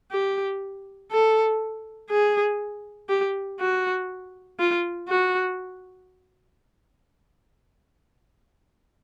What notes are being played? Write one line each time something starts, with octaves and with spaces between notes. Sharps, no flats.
G4
A4
G#4
G4
F#4
F4
F#4